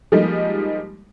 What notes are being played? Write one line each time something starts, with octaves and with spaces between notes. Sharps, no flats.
F3 G3 G#3 A#3 D#4